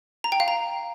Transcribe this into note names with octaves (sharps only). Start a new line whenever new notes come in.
A#5
G5
F5
A#5